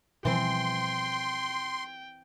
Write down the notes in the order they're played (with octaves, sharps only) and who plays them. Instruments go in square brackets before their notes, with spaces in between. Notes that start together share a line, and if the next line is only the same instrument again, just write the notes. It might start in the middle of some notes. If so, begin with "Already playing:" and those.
[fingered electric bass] B2 F3 G3 [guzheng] E3 C4 [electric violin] G5 [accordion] C6